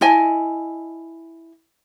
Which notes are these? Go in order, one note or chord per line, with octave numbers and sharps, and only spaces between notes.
E4 D#5 G#5 A5